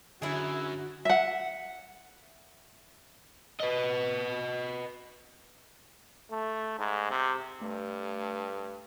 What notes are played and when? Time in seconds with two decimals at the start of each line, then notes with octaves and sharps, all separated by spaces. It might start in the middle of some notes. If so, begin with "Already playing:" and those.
0.22 F#2 D3 D4 E4 F#4 G#4
1.05 E5 F#5
3.60 B4 D#5
6.31 A3
6.79 G#2
7.11 C3
7.61 G2 A3